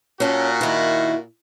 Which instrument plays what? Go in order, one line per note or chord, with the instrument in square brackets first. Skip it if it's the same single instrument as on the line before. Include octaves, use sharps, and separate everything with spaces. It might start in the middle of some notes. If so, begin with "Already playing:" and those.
[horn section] A#2 F#4 [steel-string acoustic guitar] C#4 A4
[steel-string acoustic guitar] D#3 E4